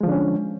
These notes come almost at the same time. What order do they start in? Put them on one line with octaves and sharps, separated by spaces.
G#3 F3 D3 D4 C#4